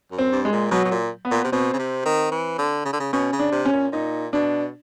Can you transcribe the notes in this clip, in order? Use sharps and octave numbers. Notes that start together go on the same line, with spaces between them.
F#2
C4
G2
G#3
A#2
B2 F#3
B2
A#2
B3
A#2
C3
B2 C4
C#3
C3
D#3
E3
D3
C#3
D3
C#3
B2 C#4
C#3
D4
C3
C#4
A#2
A#2 D#4
B2 D4